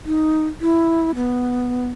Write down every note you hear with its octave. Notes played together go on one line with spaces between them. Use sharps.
D#4
E4
B3